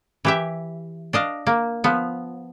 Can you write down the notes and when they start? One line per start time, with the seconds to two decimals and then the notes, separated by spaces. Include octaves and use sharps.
0.25 E3 G4 E5
1.13 D4 D#5 F5
1.47 A#3
1.84 F3 B3